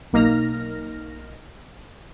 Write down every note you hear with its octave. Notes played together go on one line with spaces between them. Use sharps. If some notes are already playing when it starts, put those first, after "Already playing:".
B1 A#3 D#4 F6 A#6